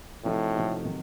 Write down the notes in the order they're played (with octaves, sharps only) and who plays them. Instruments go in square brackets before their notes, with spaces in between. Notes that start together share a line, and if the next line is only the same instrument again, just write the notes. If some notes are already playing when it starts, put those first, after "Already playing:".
[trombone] A2 [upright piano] C3 F3 A3 D#4 F#4
[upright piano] C3 F3 A3 D#4 F#4
C3 D#3 F#3